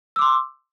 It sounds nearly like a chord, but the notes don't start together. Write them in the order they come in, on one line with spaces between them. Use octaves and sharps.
E6 D6 C6